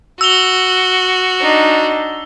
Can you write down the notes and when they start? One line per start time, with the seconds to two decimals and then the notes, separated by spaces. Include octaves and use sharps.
0.21 F#4 E6 F7 G7
1.41 D4 D#4